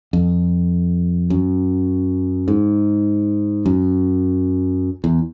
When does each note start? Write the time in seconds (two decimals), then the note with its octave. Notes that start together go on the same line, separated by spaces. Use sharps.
0.13 F2
1.30 F#2
2.48 G#2
3.66 F#2
5.04 E2